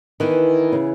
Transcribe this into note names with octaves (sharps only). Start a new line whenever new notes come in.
D#3 E3 B3 E4 G#4
C#3